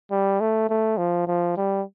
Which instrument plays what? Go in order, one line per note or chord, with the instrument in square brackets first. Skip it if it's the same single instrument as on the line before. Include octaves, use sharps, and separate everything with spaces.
[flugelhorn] G3
A3
A3
F3
F3
G3